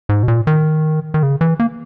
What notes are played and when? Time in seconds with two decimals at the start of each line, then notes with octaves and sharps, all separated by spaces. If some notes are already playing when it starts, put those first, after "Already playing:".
0.09 G#2
0.23 B2
0.28 A#2
0.47 D#3
1.14 D#3
1.23 C#3
1.41 E3
1.60 A#3